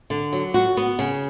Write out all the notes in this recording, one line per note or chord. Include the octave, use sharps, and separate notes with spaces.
D3
F#3
F#4
B3
C#3